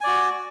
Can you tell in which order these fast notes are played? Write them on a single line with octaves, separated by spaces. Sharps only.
G#5 D5 F#4